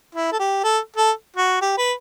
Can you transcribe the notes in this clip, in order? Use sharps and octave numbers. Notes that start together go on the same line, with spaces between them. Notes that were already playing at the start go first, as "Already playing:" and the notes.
E4
A4
G4
A4
A4
F#4
G4
B4